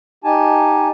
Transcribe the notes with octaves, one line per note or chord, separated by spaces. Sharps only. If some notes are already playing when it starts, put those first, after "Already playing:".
D#4 G4 G#5 A5